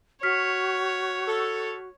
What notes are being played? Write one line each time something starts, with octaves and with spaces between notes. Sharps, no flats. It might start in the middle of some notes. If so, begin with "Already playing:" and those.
F#4 C#5 F6 B6
A4